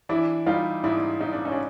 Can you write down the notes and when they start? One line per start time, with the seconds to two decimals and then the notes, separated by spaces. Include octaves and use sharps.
0.09 E3 D4 E4
0.46 G3 D#4 F4
0.84 G#2 D4 E4
1.21 G#2 D#4
1.33 D4
1.45 C#4 D#4
1.52 D4